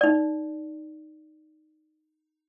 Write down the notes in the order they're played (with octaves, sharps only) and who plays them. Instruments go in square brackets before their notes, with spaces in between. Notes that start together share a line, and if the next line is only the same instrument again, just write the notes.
[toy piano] D#4 D5